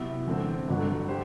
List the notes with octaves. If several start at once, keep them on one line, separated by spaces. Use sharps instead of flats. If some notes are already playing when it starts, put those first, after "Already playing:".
Already playing: C3 F#3 B3 E4
E2 D3 A3 C4
G1 G2 D3 F#3
G4 C5